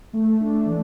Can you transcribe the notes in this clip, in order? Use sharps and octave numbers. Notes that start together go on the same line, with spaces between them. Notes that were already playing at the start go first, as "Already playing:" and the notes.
A3
D4
E3